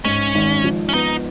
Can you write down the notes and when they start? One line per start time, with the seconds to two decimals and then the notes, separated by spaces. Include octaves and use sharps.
0.05 G#2 C#4
0.35 G#1
0.64 F3
0.89 C#4
0.94 B3 D#4